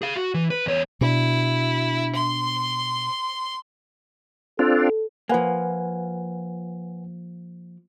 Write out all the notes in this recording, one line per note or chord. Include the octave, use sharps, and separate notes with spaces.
G#4 F5
F#4
E3
B4
E2 C#5
B2 D4 E4
C6
C4 D4 F4 A4
F3 A#3 B4 F#5 G#5